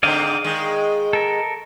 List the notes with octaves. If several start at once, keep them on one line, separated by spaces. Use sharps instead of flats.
G#2 D3 C4 D5 D#5 F5
D#3 G#3
A4 A#4